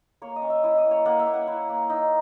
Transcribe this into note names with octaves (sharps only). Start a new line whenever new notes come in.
A#3 C#5
D#5
C#4
E5
E4 D#5
D#5
A#3
C#5
A#3 F#5
E5
A#3
F#5
E4
A#3
D#4